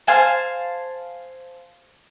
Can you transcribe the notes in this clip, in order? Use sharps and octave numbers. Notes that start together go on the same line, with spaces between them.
C5 F5 G#5 A5